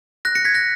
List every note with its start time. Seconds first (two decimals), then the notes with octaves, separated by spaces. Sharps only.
0.25 F#6 A#6
0.35 A#6 C#7
0.45 G#6 B6
0.54 F#6 A#6